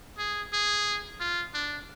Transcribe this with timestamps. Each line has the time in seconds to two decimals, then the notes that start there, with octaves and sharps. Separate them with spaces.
0.18 G#4
0.53 G#4
1.20 F4
1.54 D4